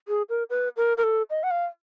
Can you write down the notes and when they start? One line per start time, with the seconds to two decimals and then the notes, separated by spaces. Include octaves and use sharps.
0.08 G#4
0.29 A#4
0.50 B4
0.77 A#4
0.97 A#4
1.03 A4
1.30 D#5
1.43 F#5
1.51 F5